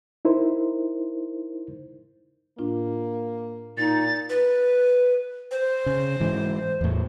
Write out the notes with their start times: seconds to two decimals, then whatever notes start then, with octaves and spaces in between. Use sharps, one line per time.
0.25 D#4 E4 A#4 C5
2.59 A2 A#3 D4 F4
3.78 A#2 D#4 A6
4.30 B4
5.51 C5
5.86 C#3
6.20 G#2 E3
6.81 E2 A2